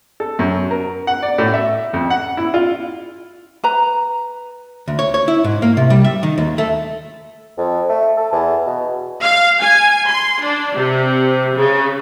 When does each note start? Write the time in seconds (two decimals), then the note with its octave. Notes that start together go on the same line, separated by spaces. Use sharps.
0.20 A4
0.39 F#2
0.71 A#4
1.07 F#5
1.22 D5
1.38 A2
1.54 E5
1.93 F2
2.10 F#5
2.37 E4
2.54 F4
3.64 B4 A#5
4.88 D2
4.99 C#5
5.14 C#5
5.28 E4
5.44 G#2
5.62 A#3
5.77 C3
5.90 G3
6.05 E5
6.23 D#3
6.38 D#2
6.58 A3
7.57 F2
7.89 A3
8.17 A4
8.33 E2
8.66 B2
9.22 F5
9.61 G#5
10.09 C6
10.43 D4
10.76 C3
11.55 C#3